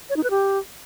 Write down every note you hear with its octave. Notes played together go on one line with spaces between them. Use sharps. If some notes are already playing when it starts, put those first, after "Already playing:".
C#5
D#4
B4
G4